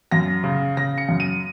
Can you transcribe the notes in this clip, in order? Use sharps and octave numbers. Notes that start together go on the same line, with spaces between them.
F#2 A#6
C#3
C#3 A#6
C#7
F#2
D#7